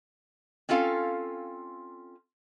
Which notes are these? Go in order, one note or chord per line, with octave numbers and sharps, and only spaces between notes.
C4 C#4 F4 A4 F5